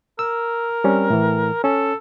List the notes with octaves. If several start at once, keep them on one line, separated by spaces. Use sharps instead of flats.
A#4 E6
G3 C4 C#4
A2 E3
C#4 A4